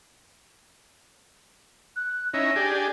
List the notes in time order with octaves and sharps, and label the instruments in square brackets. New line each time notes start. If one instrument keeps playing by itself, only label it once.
[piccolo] F#6
[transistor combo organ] C#4 D#4 E4 [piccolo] A#6
[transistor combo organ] D4 G4 G#4